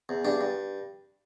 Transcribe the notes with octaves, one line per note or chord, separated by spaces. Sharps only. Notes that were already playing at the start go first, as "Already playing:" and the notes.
E2
G2 D4
G2